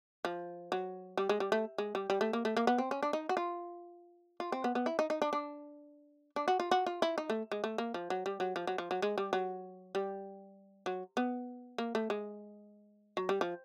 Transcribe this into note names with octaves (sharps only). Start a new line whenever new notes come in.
F3
F#3
G3
G#3
G3
A3
G#3
G3
G3
A3
A#3
A3
A#3
B3
C4
C#4
D4
D#4
F#4
F4
F4
C4
B3
B3
E4
D#4
D#4
D4
D4
D4
F#4
F4
F#4
F4
E4
D#4
A3
G#3
A3
A#3
F3
F#3
G3
F#3
F3
F#3
F3
F#3
G#3
G3
F#3
G3
F#3
B3
A#3
A3
G#3
F#3
G3
F3